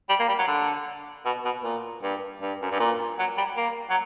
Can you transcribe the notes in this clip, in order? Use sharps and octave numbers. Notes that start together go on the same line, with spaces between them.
G3
A#3
G3
F#3
D3
B2
B2
A#2
G2
G2
F#2
G2
A#2
F#3
G3
A#3
F#3